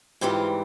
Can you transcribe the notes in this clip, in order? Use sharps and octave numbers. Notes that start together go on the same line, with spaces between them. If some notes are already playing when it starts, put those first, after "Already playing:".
G#2 E3 G3 C4 F4 G4